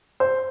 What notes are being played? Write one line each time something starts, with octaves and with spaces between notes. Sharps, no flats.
C5